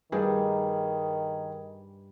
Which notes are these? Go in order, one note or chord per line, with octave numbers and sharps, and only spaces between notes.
G2 D#3 G#4